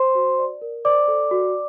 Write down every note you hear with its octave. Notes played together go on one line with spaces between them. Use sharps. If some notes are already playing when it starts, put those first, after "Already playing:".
Already playing: C5 C6
F#4
D5
A#4
C5 D5 D6
A4
F#4